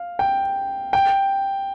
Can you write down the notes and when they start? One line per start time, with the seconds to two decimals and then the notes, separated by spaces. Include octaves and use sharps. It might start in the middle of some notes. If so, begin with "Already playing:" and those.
Already playing: F5
0.19 G5
0.93 G5